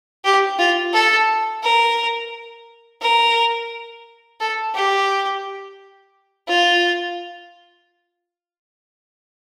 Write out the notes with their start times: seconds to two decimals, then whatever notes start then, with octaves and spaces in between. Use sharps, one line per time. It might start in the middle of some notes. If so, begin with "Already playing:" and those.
0.25 G4
0.59 F4
0.93 A4
1.63 A#4
3.01 A#4
4.40 A4
4.75 G4
6.48 F4